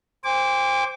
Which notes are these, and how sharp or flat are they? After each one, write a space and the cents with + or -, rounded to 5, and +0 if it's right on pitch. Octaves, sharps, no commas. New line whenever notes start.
C5 +0 G5 +45 D6 -20